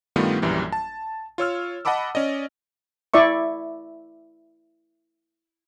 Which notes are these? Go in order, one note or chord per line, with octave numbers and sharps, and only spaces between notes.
G2 D#3 G3 A3 B3 F4
A#1 F#2 E3 G3
A5
F4 C#5 E6 F6
D#5 F#5 A5 B5 D6 E6
C#4 D5 D#5
E4 D5 E5 C#6